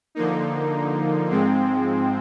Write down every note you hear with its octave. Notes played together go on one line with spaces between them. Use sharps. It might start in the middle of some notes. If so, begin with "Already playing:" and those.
D3 F3 A#3 D#4
G#2 F3 G#3 C4